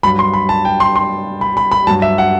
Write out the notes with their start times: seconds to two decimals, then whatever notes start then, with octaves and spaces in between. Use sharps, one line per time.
0.03 G2 F#3 B5
0.19 C6
0.34 B5
0.49 A5
0.65 G5
0.80 C6
0.96 C6
1.41 B5
1.57 B5
1.72 B5
1.87 G2 F#3 A5
2.02 E5
2.18 F#5